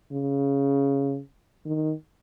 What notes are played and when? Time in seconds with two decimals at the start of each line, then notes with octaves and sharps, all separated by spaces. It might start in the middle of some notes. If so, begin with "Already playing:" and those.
0.12 C#3
1.66 D#3